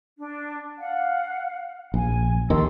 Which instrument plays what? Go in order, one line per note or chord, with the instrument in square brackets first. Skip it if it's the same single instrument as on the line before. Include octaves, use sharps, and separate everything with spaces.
[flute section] D4
F5 F#5
[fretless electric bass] A#1 [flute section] G#5
[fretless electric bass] D#2 D#3 [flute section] A4 C6 E6